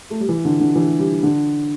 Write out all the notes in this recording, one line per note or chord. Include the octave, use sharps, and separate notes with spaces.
A3
G3
E3
D3
D3
E3
G3
D3